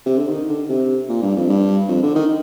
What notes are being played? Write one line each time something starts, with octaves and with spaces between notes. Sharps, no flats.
C3
D3
D#3
D3
C3
A#2
G2
F2
G2
F2
D3
D#3